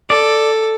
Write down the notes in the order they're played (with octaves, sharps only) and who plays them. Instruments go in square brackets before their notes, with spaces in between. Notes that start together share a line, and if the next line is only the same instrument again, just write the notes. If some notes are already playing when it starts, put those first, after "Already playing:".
[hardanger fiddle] A4 [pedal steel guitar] D5